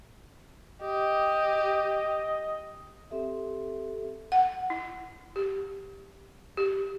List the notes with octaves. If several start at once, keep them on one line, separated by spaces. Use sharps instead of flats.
G4 D#5
C4 G4 A4 E5
F#5
E4
G4
G4